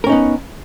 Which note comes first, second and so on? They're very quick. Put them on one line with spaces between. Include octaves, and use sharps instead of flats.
A#4 C#4 D#4 B3